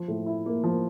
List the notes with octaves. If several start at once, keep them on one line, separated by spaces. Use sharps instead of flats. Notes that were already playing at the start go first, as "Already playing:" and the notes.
Already playing: F3
A2
E4
A#3
F3